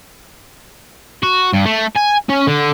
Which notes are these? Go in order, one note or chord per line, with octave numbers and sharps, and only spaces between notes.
F#4
G2
A3
G#5
C#4
D3